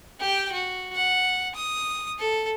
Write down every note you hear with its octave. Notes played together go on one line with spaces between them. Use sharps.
G4 G5
F#4
F#5
D#6
A4